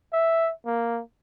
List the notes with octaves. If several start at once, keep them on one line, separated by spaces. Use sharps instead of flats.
E5
A#3